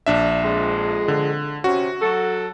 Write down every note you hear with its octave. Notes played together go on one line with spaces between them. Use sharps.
A#1 D4 E5
F2 G#3
D3
C3 C#4 F#4
F#3 A4